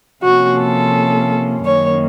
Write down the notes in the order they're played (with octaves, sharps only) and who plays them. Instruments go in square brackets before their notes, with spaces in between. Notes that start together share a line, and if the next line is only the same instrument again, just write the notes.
[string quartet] C3 F3 A#3 C#4 F#4
A4
F#2 D#3 A#3 C#5